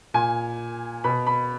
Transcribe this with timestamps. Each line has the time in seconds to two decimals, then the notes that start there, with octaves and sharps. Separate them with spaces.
0.14 A#2 G#5
1.04 B2 B5
1.27 B5